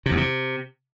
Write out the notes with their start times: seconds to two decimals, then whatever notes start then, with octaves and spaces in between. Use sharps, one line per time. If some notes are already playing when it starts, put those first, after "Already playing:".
0.06 C3
0.11 E2
0.17 C3